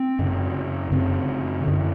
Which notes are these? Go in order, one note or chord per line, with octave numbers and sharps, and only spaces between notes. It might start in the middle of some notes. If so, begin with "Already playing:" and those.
Already playing: C4
F#2 C#3
F#2 C#3 C4
F#2 D3